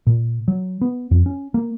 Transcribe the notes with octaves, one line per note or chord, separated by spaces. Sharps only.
A#2
F#3
B3
F2
C#4
A#3